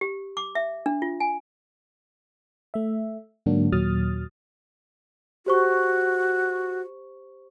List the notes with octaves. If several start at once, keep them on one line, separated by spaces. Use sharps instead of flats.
G4
D6
E5
D4
F4
G#5
A3 E5
G#2 D3 F#3 A#3 D4 F#4
D#2 A#2 F#3 D#6 F6 A6
F#4 G4 C5 C#6